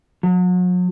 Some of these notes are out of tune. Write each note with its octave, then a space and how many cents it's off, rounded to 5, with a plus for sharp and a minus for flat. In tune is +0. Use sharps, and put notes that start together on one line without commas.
F#3 -40